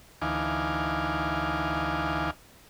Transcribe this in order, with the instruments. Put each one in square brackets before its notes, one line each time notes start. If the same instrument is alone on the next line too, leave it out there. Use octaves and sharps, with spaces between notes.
[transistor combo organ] D2 E3 D#4 F5 G#5 D6